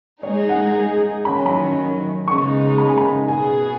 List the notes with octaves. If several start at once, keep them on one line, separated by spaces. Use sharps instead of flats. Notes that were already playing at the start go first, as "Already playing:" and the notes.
G#3 D#4 G#4 C#5
F#5
D#3 F#3 C#4 B5
G#5
B5
C#3 G#3 B3 D#4 C#6
B5
G#5
B5
B2 B3 G#4 G#5